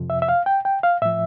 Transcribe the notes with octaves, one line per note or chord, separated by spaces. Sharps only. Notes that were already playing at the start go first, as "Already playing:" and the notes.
Already playing: F2 C3 F3
E5
E5
F5
G5
G5
F5
A2 F3 E5